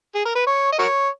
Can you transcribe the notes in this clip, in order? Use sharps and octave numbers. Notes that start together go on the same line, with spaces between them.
G#4
A#4
B4
C#5
D#5
F#4 A#4 C#5